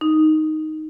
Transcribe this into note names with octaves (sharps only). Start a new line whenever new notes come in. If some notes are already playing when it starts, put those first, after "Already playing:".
D#4